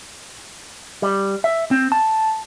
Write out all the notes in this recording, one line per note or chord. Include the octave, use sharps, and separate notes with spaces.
G3
E5
C4
A5